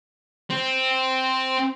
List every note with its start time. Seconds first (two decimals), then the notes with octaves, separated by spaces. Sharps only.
0.50 C4